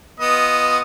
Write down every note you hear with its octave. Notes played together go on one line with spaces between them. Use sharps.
B3 F4 D#5